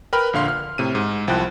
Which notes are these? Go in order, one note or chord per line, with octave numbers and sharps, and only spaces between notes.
A#4 B4 G5 B5 F6
A#1 D3 F5 C6
F6
A2 C3 D#7
G#2
C2 F3 E4 G5 A5 F#6